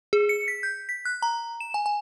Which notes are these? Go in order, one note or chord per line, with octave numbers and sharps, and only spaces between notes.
G#4
C#7
B6
G6
B6
F#6
A#5
E7
G#5
G#5